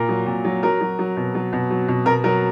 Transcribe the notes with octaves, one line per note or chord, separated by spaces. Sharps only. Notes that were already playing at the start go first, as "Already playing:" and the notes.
Already playing: A#2 A#4
F#3
A#2
F#3
F#3 A#4
F#3
F#3
B2
F#3
B2
F#3
B2
B2 A#4
F#3 A#4